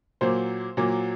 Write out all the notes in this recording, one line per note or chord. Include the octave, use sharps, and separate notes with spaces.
A#2 F#3 A#3 C5
A#2 F#3 A#3